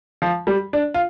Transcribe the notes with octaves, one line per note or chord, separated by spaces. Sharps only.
F3
G3
D4
F4